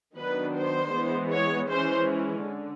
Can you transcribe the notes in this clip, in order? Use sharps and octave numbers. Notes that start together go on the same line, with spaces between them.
D#3 F#3 B3 D4 B4
C5
E3 G#3 B3
C#5
E3 G#3 C#4 C5
D3